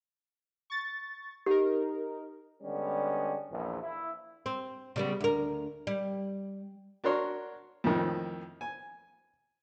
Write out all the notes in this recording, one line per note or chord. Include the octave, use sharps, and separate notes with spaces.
C#6 A6
D#4 G4 A#4
D3 G3 G#3 B3 C#4
A#1 E2
E4
C4
C#3 G3 B3
D2 A#4
G3
D4 F#4 A#4 C#5 C6
F2 A2 D#3 F3
G#5